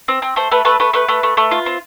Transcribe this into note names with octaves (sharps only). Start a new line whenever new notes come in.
C4
C4
A3 C5
A3 B4
A3 B4
A3 B4
A3 B4
A3
A3
A3
F4
C4